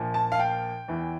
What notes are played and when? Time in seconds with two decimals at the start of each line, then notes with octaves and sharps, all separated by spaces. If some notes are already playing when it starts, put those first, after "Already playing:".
Already playing: A#1 A#2 F3
0.14 A5
0.32 F5
0.40 G5
0.88 E2 E3